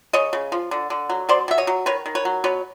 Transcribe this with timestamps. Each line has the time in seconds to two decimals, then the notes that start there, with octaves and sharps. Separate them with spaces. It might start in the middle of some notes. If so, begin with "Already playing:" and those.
0.13 C#3 C#5 D#5
0.33 C#3
0.52 F3
0.71 D3
0.90 D3
1.10 F#3
1.29 B2 C5 D5
1.48 B2 E5
1.58 C#5 D#5
1.67 F#3
1.86 D#3 B4 C#5
2.06 D#3
2.15 B4 C#5
2.25 F#3
2.44 B2 B4 C#5